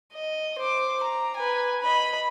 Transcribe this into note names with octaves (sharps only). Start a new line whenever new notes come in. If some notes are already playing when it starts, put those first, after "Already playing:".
D#5
C5 D6
A#5
B4 G#5
D#5 B5